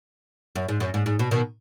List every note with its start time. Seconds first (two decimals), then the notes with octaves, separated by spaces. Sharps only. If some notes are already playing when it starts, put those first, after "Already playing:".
0.56 F#2
0.69 G#2
0.80 F#2
0.94 G#2
1.06 G#2
1.19 B2
1.31 B2 D#3